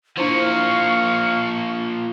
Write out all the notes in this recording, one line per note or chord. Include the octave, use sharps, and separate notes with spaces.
F3 A#3 D4 E4 C5 F5 C#6